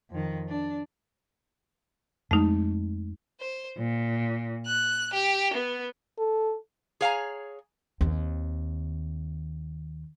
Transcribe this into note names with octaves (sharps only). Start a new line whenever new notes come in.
F2 D#3
D4
F2 G#3 A3 D#4
C5
A#2
F#6
G4
B3
A4
G#4 C#5 F5 G5 G#5 A#5
D#2 C4